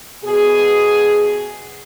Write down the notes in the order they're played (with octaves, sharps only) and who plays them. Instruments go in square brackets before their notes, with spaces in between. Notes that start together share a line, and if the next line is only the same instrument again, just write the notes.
[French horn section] B2 G#4